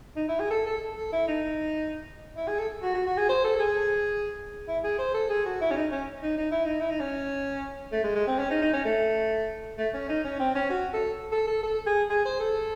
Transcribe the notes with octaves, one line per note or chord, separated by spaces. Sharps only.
D#4
E4
G#4
A4
A4
A4
E4
D#4
E4
G#4
A4
F#4
F#4
F#4
G#4
C5
A4
A4
G#4
E4
G#4
C5
A4
G#4
F#4
E4
C#4
D#4
C#4
D#4
D#4
E4
D#4
E4
D#4
C#4
A3
G#3
G#3
C4
C#4
D#4
D#4
C#4
A3
A3
C#4
D#4
C#4
C4
C#4
F#4
A4
A4
A4
A4
G#4
G#4
C5
A4